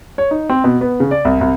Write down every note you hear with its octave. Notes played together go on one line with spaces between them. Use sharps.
C#5
D#4
C4
B2
B3
C#3
D5
C2
C2